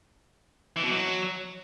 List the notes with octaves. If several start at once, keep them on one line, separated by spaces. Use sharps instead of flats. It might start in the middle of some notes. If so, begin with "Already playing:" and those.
E3
B2
F#3